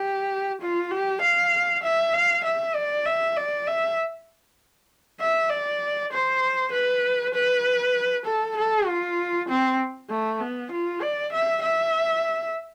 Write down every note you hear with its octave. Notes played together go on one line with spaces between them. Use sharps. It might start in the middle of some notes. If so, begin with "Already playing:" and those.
Already playing: G4
F4
G4
F5
E5
F5
E5
D5
E5
D5
E5
E5
D5
C5
B4
B4
A4
A4
F4
C4
A3
B3
F4
D5
E5
E5